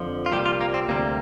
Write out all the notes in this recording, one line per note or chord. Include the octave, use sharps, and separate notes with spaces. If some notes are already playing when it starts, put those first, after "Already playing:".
Already playing: F2 D3 F3
F4
C2 A#2 G3 G4
F4
A#3
C4
D2 C3 G3 A#3